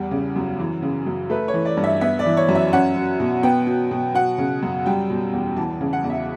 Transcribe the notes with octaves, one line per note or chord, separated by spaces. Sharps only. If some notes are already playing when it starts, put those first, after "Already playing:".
Already playing: E2 G3
C#3
F#2
E3
C#3
F#2
A3 B4
C#5
E3
D5
G2
E5
B3 E5
D5
E3
C#5
F#2
E5
C#4 F#5
F#3
B2
B3 G5
F#3
B2
F#3 F#5
C#3
F#2
G3 G5
B2
E2
E3 A5
C#3
F#5
E2
E5